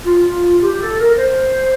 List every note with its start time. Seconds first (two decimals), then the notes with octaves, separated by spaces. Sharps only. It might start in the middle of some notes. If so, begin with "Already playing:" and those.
0.05 F4
0.62 G4
0.81 A4
1.00 A#4
1.18 C5